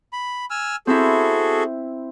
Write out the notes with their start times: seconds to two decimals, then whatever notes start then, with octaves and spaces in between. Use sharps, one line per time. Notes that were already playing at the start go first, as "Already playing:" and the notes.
0.13 B5
0.50 G#5 E6 F6
0.87 C4 E4 F#4 G#4 A4